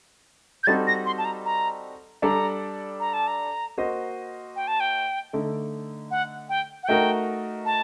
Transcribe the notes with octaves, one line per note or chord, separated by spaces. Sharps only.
G6
G3 C4 D#4 F#4 A4 A6
A#6
C6
A5
A#5
A#5
G3 D4 A4 D5 A#5
A#5
A5
A#5
A#3 F#4 C5 D#5
G5
A5
G5
D3 A3 D#4
F#5
G5
F#5
A3 D#4 F#4 A#4 G5
A5